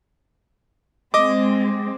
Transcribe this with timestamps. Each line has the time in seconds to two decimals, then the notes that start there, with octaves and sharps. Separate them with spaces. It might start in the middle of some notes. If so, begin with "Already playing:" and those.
1.14 G#3 C4 D#5 D6